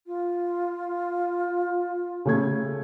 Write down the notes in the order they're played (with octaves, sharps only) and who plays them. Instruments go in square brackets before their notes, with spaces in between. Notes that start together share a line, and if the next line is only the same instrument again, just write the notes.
[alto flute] F4
[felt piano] C#3 A3 G#6